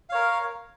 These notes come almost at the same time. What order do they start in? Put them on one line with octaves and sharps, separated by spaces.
F5 C#5 A#4